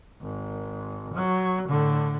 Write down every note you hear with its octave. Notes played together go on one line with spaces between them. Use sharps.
G#1
F#3
A2 D3